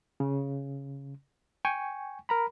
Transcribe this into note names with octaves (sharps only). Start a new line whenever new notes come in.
C#3
G5 G#5 C#6
A#4 A#5 B5